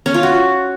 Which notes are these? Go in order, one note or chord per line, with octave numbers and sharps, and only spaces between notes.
C#4
F4
F#4